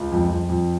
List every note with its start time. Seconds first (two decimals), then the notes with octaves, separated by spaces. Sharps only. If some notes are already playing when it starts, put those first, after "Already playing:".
Already playing: C#2
0.12 F2
0.31 F2
0.49 F2